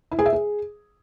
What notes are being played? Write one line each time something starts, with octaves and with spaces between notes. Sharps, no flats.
E4
G#4
E5
G#4